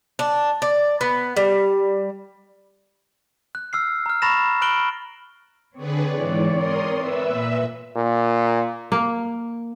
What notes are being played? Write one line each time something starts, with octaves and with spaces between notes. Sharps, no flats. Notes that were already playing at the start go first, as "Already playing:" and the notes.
D4
D5
B3
G3
F#6
E6 F6 C7
A#5 F6
A#5 B5 C#6 A6 A#6 E7
B5 F6 F#6 D7 F#7 G7
D3 C4 G#4 B4 C#5 D5
G#2 E3
A#4 C6 D#6
B4 E5 E6
A#2
A#2
A#3